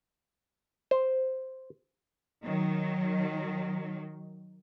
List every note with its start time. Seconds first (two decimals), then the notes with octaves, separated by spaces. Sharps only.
0.91 C5
2.43 D#3 F#3